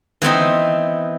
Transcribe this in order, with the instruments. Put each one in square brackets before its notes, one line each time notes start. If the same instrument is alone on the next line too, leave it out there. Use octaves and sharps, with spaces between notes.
[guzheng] E3 B3 C4 D#4